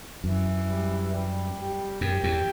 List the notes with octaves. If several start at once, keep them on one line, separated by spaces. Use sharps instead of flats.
F#2 E3
G3
G3
G4
F#2 G4
E2